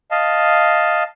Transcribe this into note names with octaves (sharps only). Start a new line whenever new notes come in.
D#5 F5 A5